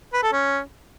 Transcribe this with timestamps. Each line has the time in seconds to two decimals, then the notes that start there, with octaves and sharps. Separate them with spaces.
0.13 B4
0.23 A4
0.32 C#4